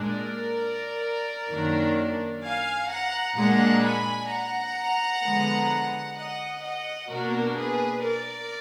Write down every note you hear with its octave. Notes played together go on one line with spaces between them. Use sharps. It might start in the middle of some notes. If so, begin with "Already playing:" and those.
Already playing: A#2 G#3 D4 A#4 D5
F#2 D#3 F#3 A#3 D4
F5 G#5
F#5 A#5
A#2 G#3 D4 F#5 A#5
G#5 B5
F#5 A#5
D3 F3 G#3 B3
D#5 F#5
D#5 F#5
B2 A#3 D4 F#4 A#4
G#4 B4
A#4 D5